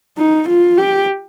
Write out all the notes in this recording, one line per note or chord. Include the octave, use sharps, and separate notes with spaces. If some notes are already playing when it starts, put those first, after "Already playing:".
D#4
F4
G4